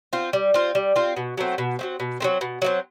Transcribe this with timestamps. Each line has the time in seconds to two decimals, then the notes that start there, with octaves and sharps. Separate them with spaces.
0.13 C4 F4
0.33 G3
0.54 C4 F4
0.75 G3
0.96 C4 F4
1.17 B2
1.37 F#3 A3 C4
1.58 B2
1.79 F#3 A3 C4
2.00 B2
2.20 F#3 A3 C4
2.41 B2
2.62 F#3 A3 C4